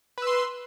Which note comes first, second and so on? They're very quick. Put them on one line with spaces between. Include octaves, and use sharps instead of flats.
B4 E6 C6